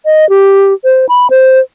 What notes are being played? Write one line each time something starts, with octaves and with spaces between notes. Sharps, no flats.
D#5
G4
C5
B5
C5